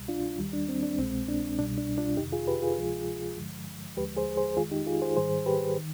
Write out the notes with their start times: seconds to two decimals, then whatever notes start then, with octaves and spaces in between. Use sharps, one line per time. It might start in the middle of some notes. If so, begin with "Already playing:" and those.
Already playing: C2 B2 G3
0.08 D4 F4
0.38 D#2 D#3 G3
0.53 D4
0.69 C4
0.83 D4
0.98 C2 B2 G#3 C4
1.28 D4
1.58 C2 B2 G3 D4
1.78 D4
1.98 D4 F4
2.17 F2 C3 D#3 D#4 G4
2.33 F4 G#4
2.48 G4 B4
2.62 F4 G#4
2.78 D2 C3 F3 G#3
3.37 G2 D3 F3 G#3
3.97 D#2 D3 F3 G#3 G4 B4
4.17 G#4 C5
4.37 G#4 C5
4.57 F2 D#3 G#3 F4 G#4
4.71 D#4 G4
4.87 F4 G#4
5.02 G#4 C5
5.16 G#2 D#3 G3 G#4 C5
5.46 G4 B4
5.78 D#3